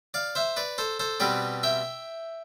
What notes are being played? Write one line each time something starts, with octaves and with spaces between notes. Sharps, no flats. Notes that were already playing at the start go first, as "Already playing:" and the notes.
D5 F5
C5 E5
B4 D5
A4 C5
A4 C5
B2 G3 C4 B4 D5
E5 G5